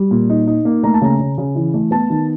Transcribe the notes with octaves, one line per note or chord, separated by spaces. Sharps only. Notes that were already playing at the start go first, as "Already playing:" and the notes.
Already playing: G3
A#2
D#4
D#4
A#3
A3 A#5
A5
C#3 A#5
C#3
C#3
E3
A3
B3 A5
D#3